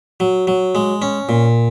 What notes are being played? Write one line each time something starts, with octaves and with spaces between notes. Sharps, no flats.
F#3
F#3
G#3
C#4
A#2